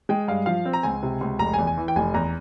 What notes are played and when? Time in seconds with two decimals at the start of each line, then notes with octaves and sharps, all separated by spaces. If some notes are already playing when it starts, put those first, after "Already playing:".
0.09 G#3 G5
0.28 G2 F5
0.46 F3 F5
0.65 C4
0.73 A#5
0.83 C#2 G#5
1.03 C3
1.21 C#2
1.39 F1 A#5
1.54 G#5
1.59 E2
1.67 G#5
1.77 E3
1.88 G5
1.96 F1 G#5
2.14 E2 A#5